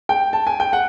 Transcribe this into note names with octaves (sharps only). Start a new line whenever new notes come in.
G5
A5
G#5
G5
F#5